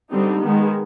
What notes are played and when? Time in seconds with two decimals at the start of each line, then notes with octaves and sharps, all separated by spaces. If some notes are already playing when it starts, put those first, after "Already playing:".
0.11 D3 G3 C4 D#4
0.42 D#3 G#3 B3